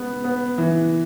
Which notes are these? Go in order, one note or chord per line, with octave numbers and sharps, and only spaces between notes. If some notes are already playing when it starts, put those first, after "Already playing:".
Already playing: G#3 B3
B3
E3